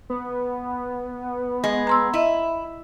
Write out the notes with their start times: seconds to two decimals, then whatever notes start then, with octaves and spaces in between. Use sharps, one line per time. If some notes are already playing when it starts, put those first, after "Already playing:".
0.10 B3
1.64 G#3
1.87 A#5 C6 E6
2.13 E4 D#5 E5